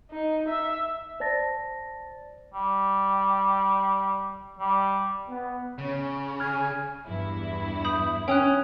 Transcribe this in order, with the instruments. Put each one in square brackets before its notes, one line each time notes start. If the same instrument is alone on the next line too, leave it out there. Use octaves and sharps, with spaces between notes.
[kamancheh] D#4
E5
[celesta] C5 D5 A5 A6 A#6
[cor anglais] G3
G3
[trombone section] B3
[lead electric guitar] C#3 [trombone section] C#4
[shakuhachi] G#5 [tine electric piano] F6 G#6
[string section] E2 G2 E4
[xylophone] B5 D#6 G6
[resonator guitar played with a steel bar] C#4 [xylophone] G5 D#6 F#6